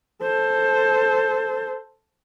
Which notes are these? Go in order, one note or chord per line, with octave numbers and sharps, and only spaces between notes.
A4 C5